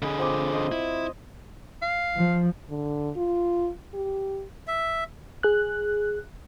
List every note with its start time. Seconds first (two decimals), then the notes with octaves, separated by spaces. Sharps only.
0.02 D3 G#4 D#5 B5
0.18 F3 C4 D6
0.53 D#5 C6
0.72 E4
1.82 F5
2.16 F3
2.70 D3
3.16 F4
3.94 G4
4.67 E5
5.43 G#4 F#6